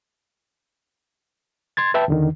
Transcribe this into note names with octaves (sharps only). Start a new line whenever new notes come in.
C6 G#6 A6
B4 E5 G5 A5
E2 D3 D#3